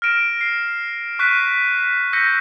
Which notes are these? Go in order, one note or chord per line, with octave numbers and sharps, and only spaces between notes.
F6 A#6 D7 E7
C7
C#6 F#6 B6 D#7 E7
E6 G6 A#6 B6 C#7